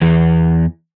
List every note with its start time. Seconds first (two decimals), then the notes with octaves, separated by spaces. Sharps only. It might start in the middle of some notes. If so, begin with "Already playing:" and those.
0.01 E2 E3